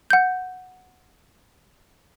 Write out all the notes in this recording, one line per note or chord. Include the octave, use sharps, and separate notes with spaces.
F#5 G6